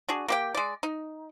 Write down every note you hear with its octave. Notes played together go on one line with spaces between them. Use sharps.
D4 F#4 G#4
A#3 G4 G5
G#3 D5
D#4